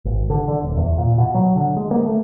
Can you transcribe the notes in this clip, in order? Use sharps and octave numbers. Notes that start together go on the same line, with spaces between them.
G#1
D3
D3
D#1
E2
A#2
B2
F#3
D3
G#3
A#3
A3